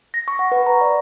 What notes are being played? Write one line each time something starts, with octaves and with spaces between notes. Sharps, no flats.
A#6
C#6
F#5
B4
A#5
D5